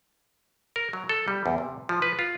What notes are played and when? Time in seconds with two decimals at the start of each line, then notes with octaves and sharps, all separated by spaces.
0.76 A#4
0.93 F#3
1.09 A4
1.28 G3
1.46 E2
1.58 C3
1.89 F3
2.02 B4
2.19 F4